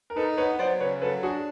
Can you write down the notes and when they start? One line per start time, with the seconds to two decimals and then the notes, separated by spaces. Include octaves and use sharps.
0.10 A#4
0.16 D#4 A4 B4
0.37 B3 B4 C#5
0.59 F#3 C5 D5
0.80 C#3 B4 C#5
1.02 F#3 A4 B4
1.22 D4 F#4 G#4